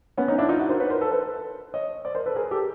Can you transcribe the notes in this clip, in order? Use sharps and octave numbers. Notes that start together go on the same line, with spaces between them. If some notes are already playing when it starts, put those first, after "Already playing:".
B3 C#4
C#4 D#4
D4 E4
D#4 F4
E4 F#4
A#4 C5
B4 C#5
A#4 C5
A4 B4
A4 B4
C#5 D#5
C5 D5
A#4 C5
A4 B4
G#4 A#4
G4 A4